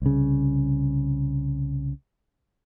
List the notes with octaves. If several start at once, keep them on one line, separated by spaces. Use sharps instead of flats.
C2 C#3